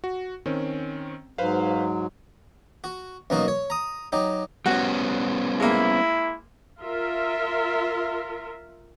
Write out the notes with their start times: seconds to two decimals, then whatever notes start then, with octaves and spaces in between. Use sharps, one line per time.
0.04 F#4
0.46 D#3 C4 C#4
1.38 G#2 F#3 B4 C5 F5
2.84 F#4
3.30 F#2 B2 A#3 D#4 F#4
3.48 C#5
3.70 A#5 D#6
4.12 F#3 D#4 G4
4.66 G3 B3 C#4 F#4
5.60 G#3 A#3 E4
6.79 F4 A#4 E5